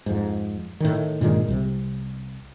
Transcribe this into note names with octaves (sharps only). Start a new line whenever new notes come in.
F2 G#2
A2 D#3
G2 A#2 D#3 G#3
C2 C3